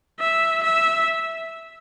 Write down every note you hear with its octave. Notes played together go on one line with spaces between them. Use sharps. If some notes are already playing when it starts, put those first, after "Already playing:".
E5
E5